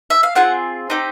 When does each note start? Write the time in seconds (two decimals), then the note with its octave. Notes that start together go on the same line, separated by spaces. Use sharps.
0.10 E5
0.23 F5
0.35 C4 F4 G#4 F#5
0.90 C4 D#4 G4 G5